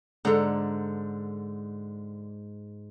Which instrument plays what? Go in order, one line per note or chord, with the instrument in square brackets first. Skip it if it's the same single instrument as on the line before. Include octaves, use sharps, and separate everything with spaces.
[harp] G#2 [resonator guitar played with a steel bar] D3 [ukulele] A4 A#5